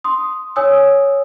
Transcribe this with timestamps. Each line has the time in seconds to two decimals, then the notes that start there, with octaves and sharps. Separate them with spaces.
0.04 C6 D#6
0.56 C#5 G#5 D#6 E6